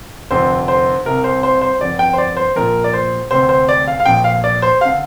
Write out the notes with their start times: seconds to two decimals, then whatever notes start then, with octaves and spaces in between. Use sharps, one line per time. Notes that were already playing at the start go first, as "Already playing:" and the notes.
0.31 F1 F2 D3 C5
0.68 C5
1.05 C2 C3 A#4
1.24 C5
1.43 C5
1.61 C5
1.80 G1 F2 D3 D5
1.99 G5
2.13 C5
2.18 D5
2.37 C5
2.56 A#1 A#2 A#4
2.84 D5
2.93 C5
3.31 D2 C3 C5
3.49 C5
3.69 D5
3.88 F5
4.00 F5
4.06 A#1 A#2 G5
4.24 F5
4.44 D5
4.62 C5
4.81 D3 F5